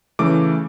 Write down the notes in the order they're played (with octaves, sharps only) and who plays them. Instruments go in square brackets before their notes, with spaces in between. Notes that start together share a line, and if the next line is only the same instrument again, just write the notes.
[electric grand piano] C#3 E3 A3 D6